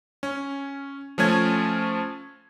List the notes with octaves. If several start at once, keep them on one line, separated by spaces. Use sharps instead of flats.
C#4
F3 A3 C#4 G#6